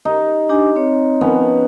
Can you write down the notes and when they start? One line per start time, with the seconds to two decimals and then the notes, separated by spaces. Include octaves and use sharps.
0.05 D#4 G4
0.49 D4 G4 G#5
0.76 C4 C#5
1.21 F3 B3 C#4